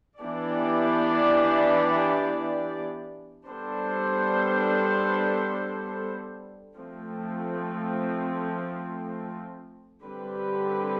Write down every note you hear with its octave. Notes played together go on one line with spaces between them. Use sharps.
E3 B3 D4 G4 D5
G3 B3 D4 A4 C5
F3 A3 C4
D3 G3 C4 G4 B4